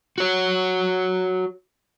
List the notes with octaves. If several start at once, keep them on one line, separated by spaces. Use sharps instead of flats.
F#4 C#5